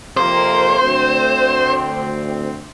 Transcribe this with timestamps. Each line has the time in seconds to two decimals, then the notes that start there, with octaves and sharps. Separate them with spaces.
0.17 F2 C3 A#3 C5
0.81 D2 C4